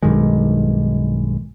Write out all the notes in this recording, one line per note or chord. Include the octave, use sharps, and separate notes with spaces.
B1 G2 D#3 G#3